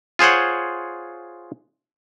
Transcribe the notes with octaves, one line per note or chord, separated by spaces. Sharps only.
F4 G#4 C5 C#5 F#5